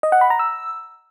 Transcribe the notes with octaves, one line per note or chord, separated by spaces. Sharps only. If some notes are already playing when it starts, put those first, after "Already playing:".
D#5
F#5
B5
A#5
E6